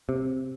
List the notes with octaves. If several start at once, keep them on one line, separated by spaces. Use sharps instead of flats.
C3